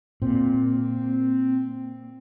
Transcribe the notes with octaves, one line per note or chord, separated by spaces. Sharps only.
A#2 C4